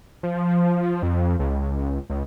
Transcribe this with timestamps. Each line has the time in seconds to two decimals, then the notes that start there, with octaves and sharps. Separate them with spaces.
0.23 F3
1.03 F2
1.39 C#2
2.10 C#2